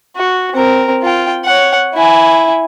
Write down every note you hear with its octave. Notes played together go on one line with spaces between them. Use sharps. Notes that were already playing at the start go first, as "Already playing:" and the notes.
F#4
C4 A#4
F4 G5
C#5 F#5
E4 G#5